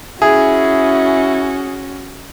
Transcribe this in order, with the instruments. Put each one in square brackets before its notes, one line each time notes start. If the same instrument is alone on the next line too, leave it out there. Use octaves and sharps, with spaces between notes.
[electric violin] C#4 F#4 [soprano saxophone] E4 [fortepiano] G#4